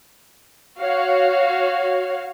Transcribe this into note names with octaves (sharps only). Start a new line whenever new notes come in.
F#4 C#5 F5